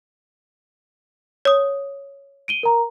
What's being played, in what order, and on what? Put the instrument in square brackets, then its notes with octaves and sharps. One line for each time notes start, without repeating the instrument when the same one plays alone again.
[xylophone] C#5 D#6
[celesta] D7 D#7 G7
A#4 A#5